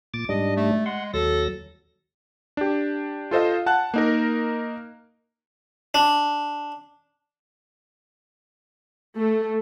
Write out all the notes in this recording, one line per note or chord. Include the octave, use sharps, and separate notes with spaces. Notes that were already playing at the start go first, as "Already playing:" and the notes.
A#2 D6 A6
G#2 G3 D4 D#5
A3
G#3 F#5 C6
D#2 F#3 A4 A#6
D4 G4
F4 A4 C5 D#5 F5
F#5 A5 F#6
A#3 D#4 A#4
D4
A3